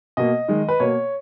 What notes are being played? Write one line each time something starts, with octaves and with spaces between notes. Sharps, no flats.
B2 A#3 D#5
D#3 G#3
B4
B2 A#3 C#5